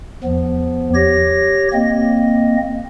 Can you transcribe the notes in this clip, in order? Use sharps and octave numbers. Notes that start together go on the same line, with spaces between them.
E2 F3 B3
G4 C#5 A#6
A#3 C4 D#5